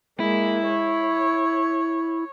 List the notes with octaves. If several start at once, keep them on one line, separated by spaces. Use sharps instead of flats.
G#3 A#3 E4
C#5